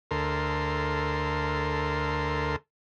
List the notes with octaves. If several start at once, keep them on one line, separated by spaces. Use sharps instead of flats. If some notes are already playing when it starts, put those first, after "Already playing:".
D2 A4 A#4 C6